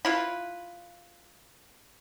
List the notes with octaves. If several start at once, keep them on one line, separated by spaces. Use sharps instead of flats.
E4 F4 B4